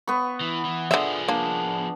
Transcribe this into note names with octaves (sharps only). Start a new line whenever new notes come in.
B3 C#6
E3
E3
D3 F3 G#4 E5
A#3 D4